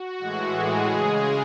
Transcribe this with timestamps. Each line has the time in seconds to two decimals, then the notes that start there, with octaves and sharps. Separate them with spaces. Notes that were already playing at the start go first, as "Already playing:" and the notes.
Already playing: F#4
0.19 A2 E3 G#3
0.53 G#4
0.86 C#3 G#3